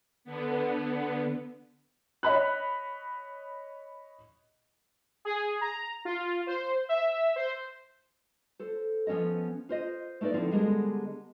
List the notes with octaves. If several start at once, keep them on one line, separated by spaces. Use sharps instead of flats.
D3 B3
C#5 D#5 B5 F#6
G#4
A#5
F4
C5
E5
C5
A4 C5
F3 B3 C#4 A4 D#5
F4 C5 D#5
A3 A#3 D#4 B4 D5
D3 F3 C4 D#4 E4
D3 G3 G#3 B3 G#4 A#4